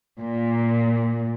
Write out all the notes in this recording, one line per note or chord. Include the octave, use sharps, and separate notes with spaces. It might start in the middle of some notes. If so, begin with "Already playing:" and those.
A#2